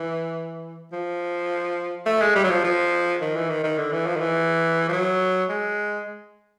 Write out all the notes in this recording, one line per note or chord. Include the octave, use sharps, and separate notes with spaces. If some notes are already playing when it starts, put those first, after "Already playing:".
Already playing: E3
F3
A3
G#3
G3
F#3
F3
F3
D#3
E3
D#3
D#3
D3
E3
F3
D#3
E3
F3
F#3
G#3